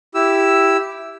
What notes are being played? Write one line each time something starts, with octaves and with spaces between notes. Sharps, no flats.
E4 G4 E6